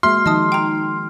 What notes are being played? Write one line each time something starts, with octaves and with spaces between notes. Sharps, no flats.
G#3 A#3 F#4 E5 C6 F6 G7
D#3 F3 D#4 D#5 A5 D#6
G5 A#5